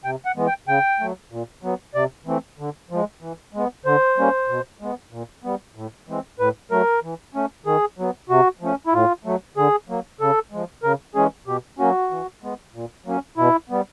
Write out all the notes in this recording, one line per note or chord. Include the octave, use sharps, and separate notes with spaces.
C3 G5
F#5
E3 G#3 B3
G5
C#3 G5
F#3 A3
A#2
F#3 B3
C3 D5
E3 A3 C4
D3
F3 G#3
E3
G#3 B3
D3 C5
G3 A#3 C#4
B2
G#3 B3
A#2
G3 B3
A2
E3 G#3 C4
A2 B4
F#3 A3 A#4
E3
A3 C#4
D#3 G#4
F#3 B3
C3 F#4
F3 A3 C#4
E4
A2 F4
F#3 A3
D3 G#4
F#3 A#3
C#3 A4
F3 G#3
C#3 A#4
E3 G#3 C#4 G#4
B2 G4
F#3 A#3 C#4 F#4
E3
G#3 B3
A#2
F#3 A#3 C#4
B2 E4
G3 B3